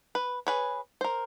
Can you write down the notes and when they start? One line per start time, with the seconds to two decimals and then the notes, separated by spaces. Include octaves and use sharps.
0.15 B4
0.47 G#4 B4 C#5
1.01 A#4 C5